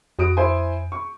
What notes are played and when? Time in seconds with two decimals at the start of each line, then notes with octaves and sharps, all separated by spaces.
0.19 F2 F#4 D#6 D7
0.37 E4 C5 G#5
0.92 C#6